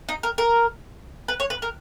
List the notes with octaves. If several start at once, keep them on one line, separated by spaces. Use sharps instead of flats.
D#4
A#4
A#4
B4
C#5
B4
A#4